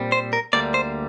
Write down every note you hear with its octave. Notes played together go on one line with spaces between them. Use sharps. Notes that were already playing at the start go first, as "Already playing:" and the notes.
Already playing: A#2 G3 C4
C5
A#4
D2 D3 G3 A#3 D5
C5